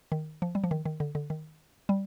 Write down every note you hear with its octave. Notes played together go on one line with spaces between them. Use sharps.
D#3
F3
G3
F3
D#3
D#3
D3
D3
D#3
G3